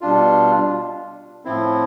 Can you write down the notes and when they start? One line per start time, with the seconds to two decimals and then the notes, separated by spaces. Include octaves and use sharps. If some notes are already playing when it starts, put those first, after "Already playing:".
0.01 B2 G3 D4 F4
1.45 A2 F3 C4 E4